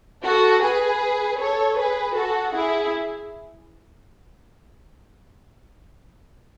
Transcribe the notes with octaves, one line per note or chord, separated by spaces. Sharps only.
F#4 A4
G#4 B4
A4 C#5
G#4 B4
F#4 A4
E4 G#4